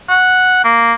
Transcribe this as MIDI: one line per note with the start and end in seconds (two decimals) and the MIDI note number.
0.09 0.59 78
0.64 0.93 58